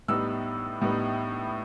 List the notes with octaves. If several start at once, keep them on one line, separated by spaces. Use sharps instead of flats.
A2 G3 B3 D#4 E6
A2 G3 B3 D#4